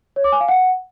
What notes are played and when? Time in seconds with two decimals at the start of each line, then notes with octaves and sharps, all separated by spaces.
0.16 C#5
0.24 D6
0.32 G#5
0.40 F5
0.48 F#5